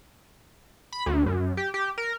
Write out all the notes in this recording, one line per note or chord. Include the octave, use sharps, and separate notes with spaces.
B5
D2
F#2
G4
G4
A#4